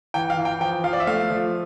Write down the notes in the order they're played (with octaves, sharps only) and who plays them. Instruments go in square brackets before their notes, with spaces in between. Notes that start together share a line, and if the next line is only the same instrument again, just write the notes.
[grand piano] E3 G5
F5
E3
G5
F3 G5
F3 F5
D5
E5
A3 F5
F3